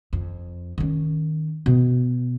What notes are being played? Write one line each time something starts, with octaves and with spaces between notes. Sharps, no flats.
F2
D#3 C#4
B2